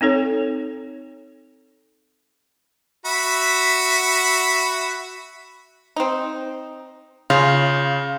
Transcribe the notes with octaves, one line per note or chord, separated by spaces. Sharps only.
C4 D#4 A4 C#5
F#4 E5 B5
C4 D#4
C#3 F4